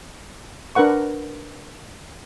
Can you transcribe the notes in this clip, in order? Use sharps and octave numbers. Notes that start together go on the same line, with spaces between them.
D4 A#4 B4 F#5 C#6